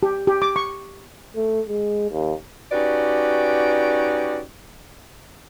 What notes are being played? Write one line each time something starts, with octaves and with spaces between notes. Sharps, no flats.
G4
G4
D6
C#6
A3
G#3
D#2
C#4 D#4 F#4 G4 B4 D5